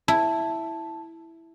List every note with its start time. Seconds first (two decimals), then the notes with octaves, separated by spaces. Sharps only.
0.08 E4 A5